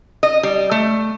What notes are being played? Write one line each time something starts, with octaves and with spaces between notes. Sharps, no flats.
D#5
G3
A3